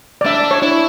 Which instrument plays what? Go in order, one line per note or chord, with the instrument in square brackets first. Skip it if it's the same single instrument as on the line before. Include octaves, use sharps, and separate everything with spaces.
[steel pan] D5
[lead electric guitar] D4 [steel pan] E5
[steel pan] C#5
[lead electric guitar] E4